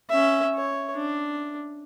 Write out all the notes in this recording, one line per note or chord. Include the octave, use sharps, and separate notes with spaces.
C#4 E5
C#5
D4